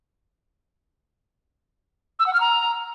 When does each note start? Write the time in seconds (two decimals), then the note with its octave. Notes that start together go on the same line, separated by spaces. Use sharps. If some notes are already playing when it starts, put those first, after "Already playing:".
2.20 E6
2.27 F#5
2.34 F6
2.41 A#5